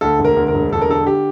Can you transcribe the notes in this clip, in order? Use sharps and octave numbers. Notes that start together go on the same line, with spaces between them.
D2 A4
E1
A#4
D2
A#4
E1
E1 A4
A#4
D3 A4
G4